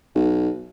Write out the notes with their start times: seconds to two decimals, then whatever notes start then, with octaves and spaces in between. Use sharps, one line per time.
0.15 B1